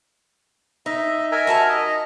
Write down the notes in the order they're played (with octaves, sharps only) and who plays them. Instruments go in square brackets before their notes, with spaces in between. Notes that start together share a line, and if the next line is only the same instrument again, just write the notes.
[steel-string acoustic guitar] D#4 [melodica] D#5 E5
[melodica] A#4 E5 G#5
[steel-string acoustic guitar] F#4 A5 A#5
[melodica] D#5